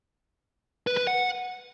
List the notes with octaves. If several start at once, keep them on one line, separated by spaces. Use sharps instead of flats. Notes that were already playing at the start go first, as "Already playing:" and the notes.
B4
B4
F#5